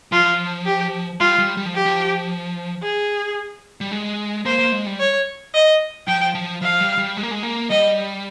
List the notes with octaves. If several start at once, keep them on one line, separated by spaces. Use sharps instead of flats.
F3 F4
G4
G3 F4
G3
G3
F3
G4
F3
G#4
G3
G#3
A#3 C5
A#3
G#3
G3
C#5
D#5
F3 G5
F3
F3 F5
G3
G3
G#3
A#3
G#3
A#3
G3 D#5